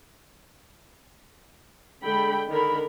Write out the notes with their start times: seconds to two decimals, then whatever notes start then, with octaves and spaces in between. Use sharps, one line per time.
2.02 D3 G#3 A4 G5 B5
2.49 D3 D#3 A#4 B5